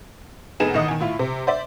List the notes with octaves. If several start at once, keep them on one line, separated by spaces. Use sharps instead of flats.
F1 B3 D#4 G#4 E7
A1 D#3 D#5 F#5 D#6
D#3 G#5
A2 E4 F4
C3
C5 D5 E5